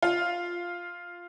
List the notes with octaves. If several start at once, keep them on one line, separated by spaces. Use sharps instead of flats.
F4